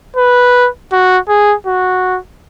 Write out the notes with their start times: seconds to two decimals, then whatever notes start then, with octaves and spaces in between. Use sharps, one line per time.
0.17 B4
0.92 F#4
1.29 G#4
1.67 F#4